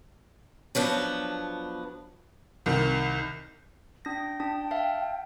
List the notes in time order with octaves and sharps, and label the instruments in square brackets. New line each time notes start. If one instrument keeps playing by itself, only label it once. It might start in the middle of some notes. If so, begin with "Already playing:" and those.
[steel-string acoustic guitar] F3 F#3 B3 D4
[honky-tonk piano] C2 D#3
[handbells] D4 A#6 [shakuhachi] G5
[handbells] D4 A5
E5 F5 A5